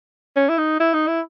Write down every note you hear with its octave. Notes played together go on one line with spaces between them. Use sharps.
C#4
E4
D#4
E4
D#4
E4